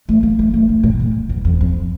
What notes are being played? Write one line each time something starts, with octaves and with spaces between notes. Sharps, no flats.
A3
A#3
A3
A3
D3
A#2
A#2
E2
F2
F2